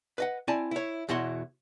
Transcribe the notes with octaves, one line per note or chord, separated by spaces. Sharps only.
B4 D#5 F#5
C4 E4 D5 G#5 A5
E4 C#5
E2 B2 E4 F#4 C#5 C6